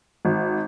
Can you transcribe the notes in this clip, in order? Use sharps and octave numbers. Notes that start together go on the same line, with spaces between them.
G#1